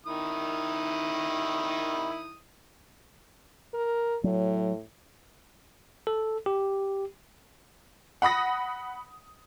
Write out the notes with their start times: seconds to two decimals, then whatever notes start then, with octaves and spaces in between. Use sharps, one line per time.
0.06 D#3 E4 D#6
3.74 A#4
4.24 A2 F#3
6.07 A4
6.46 G4
8.22 F#5 B5 D#6 A#6